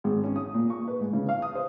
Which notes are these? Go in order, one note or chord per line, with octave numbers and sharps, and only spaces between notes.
G#1
C#4
D#6
A#2
C#6
B4
G#2
C#3
F5
D#6
C5